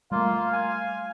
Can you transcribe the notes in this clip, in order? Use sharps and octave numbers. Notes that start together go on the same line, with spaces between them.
G3 A3 A#3 F4 F5
G#5